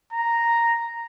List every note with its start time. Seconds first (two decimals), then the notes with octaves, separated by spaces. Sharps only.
0.13 A#5